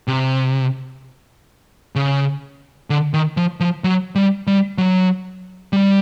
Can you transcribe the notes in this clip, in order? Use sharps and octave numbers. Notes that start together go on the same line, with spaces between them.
C3
C#3
D3
D#3
F3
F3
F#3
G3
G3
F#3
G3